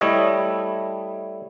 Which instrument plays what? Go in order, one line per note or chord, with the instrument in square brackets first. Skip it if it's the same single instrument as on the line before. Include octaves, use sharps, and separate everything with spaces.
[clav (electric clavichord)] G3 A3 E4 C#5 D#5